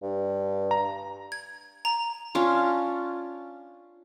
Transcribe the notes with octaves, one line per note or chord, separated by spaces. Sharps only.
G2
A#5
G#6
A#5
C#4 D4 F4